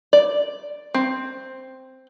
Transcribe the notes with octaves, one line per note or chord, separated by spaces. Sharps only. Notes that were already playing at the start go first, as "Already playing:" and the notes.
D5
C4